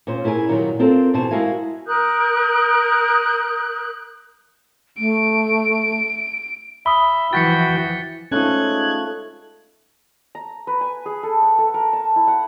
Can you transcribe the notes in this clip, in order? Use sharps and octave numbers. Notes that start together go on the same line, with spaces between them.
A#2 C#4 C5
C#4 E4 G#4 A#4 G#5
A#2 D#3 F#3 G3 A#4
C4 F4 A4 A#4 C5
E2 B2 C5 G#5 A5
G#3 E4 F#4 A#4 F5 G#5
A#4 D#6 F#6 G6
A3 D7
E5 B5 D#6 G7
E3 F3 F#4 G5 A6 B6 C#7
F3 G#3 A3 C#4 D#4 A4 F#6 G#6
A#5
B4
G#5
G#4
A4
F#5
A4
A#4
A5
E4
F#5